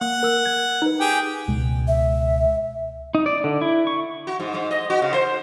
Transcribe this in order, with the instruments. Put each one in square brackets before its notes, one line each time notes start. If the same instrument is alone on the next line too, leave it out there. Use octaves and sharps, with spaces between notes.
[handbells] A#3 [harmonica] F#5
[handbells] A#4 E6
G#6
D#4 B4
[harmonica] G4 G#4 G5
[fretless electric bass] C#2 B2 G#3
[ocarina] E5
[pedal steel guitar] D#4
D5
D3
E4
C#6
[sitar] F#4
G#2
G#2
D#5
F#4
C#3
C5